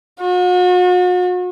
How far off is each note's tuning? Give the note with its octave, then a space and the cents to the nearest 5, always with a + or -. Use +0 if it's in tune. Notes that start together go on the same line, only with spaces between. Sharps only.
F#4 -40